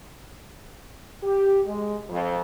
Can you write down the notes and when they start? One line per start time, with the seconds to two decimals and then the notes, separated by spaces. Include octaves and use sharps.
1.23 G4
1.65 G#3
2.09 F2